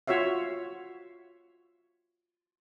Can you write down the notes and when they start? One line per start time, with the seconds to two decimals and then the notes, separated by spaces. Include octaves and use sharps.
0.07 F4 F#4 C#5 E5 F5